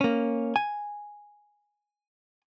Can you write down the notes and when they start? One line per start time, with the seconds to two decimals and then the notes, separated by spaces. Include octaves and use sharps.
0.01 A#3 C#4
0.56 G#5